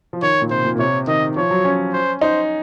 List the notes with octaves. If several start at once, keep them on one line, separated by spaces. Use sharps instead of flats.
F3
D#3 C#5
A#2
C3 C5
A#2
A#2
C3 C#5
D#3 D#5
F3 C#5
F#3
C#4
C5
D#4 C5